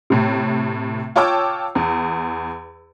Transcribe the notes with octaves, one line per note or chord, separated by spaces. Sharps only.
A2 C3
F4 C#5 G5 A5 D6 E6
E2